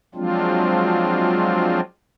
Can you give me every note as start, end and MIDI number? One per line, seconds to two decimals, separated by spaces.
0.15 1.80 53
0.15 1.80 54
0.15 1.80 56
0.15 1.80 60
0.15 1.80 62
0.15 1.80 65